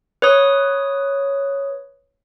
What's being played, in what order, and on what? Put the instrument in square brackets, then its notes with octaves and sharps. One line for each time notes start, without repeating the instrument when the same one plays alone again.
[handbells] B4 C#5 D#6